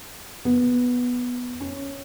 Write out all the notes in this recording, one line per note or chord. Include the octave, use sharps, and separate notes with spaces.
B3
C#4